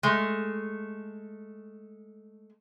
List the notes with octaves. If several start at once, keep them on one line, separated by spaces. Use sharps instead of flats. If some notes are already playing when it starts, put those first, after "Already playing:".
G#3 A3